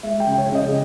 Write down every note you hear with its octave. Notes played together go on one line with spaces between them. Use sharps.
G#3 E5
G5
C#3
C#5
C#3
D#5
G#4